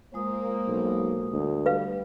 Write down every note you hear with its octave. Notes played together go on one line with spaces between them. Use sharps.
G#3 A#3 F4 C5 D#6
B1
D2
G3 B4 F5